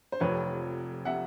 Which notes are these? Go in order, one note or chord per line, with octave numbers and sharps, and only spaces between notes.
C5
F1 F2 C3 B4 C#5
C3 E5 F#5